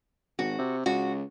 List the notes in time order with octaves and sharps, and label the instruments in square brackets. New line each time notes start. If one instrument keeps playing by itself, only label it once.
[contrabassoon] G#1 [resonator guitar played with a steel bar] F#4
[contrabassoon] C3
[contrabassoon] C#2 [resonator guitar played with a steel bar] F#4